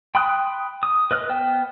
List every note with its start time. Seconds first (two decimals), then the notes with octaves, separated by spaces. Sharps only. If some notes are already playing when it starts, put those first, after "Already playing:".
0.15 G5 B5 C6 D#6 F#6
0.83 D#6
1.11 B4 D#5 F6 F#6
1.29 B3 C5 G5